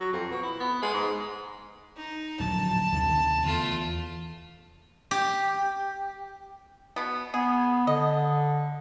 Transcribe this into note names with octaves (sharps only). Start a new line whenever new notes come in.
F#3
F2
B2
E4
B3
G#3
G#2
D#4
D1 A#1 F#3 A5
D2 C3 D#3
E2 A3 F4
G4
B2 B3
B3 G#4
D3 D#5